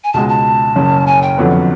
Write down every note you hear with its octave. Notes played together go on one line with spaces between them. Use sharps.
G#5
C#2 B2 G#3 A5
A5
F#1 F#2 C#3
G#5
G5
F1 F2 D3 F#3 B3